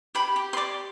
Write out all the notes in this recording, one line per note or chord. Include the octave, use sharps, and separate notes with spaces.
G4 B5
G4
C6
D5 D6